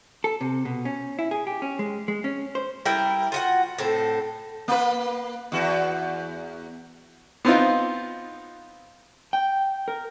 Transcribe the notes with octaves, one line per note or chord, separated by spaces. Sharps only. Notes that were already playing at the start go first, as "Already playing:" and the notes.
A4
C3
B2
C#4
E4
G#4
G4
C#4
G#3
G#3
C#4
C5
G3 E4 A#4 G5
F4 F#4 F#5
A2 C4 A4
A#3 B4
E2 F#4
B3 C4 D#4 F4
G5
A#4